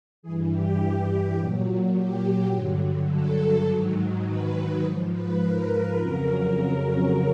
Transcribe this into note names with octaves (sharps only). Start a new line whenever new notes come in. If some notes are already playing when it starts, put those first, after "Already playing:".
G2 E3 G#4
G4
A#2 F#3
G4
G2 D3 F#3
A4
G#2 D#3 F#3
B4
G#2 F3 C5
B4
A#4
F2 C#3 F#3 A#4